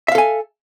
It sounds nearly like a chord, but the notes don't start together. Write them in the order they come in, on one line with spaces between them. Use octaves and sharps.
E5 F5 A4 G#5